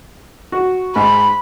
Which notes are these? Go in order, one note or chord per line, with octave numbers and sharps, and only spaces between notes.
F#4
G#2 B5